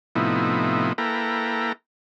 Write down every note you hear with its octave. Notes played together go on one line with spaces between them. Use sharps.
A2 C3 F3 B3 D#4 E4
A#3 E4 A4 B4 G5 A#5